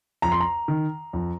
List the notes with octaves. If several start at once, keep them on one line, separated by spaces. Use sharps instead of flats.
F2 A#5
C6
A#5
D#3
F2